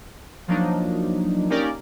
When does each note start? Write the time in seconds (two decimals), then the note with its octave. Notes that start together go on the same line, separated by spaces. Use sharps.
0.48 F3 F#3 A#3 D4 D#4
1.50 A#3 C#4 D#4 G4 A#4 D5